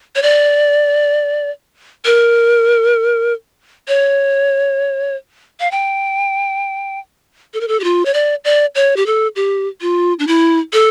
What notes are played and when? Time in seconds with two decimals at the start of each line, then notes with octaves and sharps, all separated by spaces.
0.16 C#5
0.23 D5
2.05 A#4
3.88 C#5
5.60 F5
5.71 G5
7.54 A4
7.61 A#4
7.68 A4
7.80 G4
7.84 F4
8.05 C#5
8.14 D5
8.44 D5
8.75 C#5
8.96 G4
9.06 A4
9.36 G4
9.81 F4
10.19 D4
10.27 E4
10.73 A4